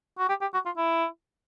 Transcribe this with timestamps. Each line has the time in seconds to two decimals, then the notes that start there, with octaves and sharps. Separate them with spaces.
0.18 F#4
0.29 G4
0.41 G4
0.54 F#4
0.66 F4
0.77 E4